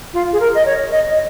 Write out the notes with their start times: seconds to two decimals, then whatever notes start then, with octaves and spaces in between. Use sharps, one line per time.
0.14 F4
0.33 G#4
0.40 A#4
0.55 D#5
0.66 C#5
0.92 D#5
1.10 D#5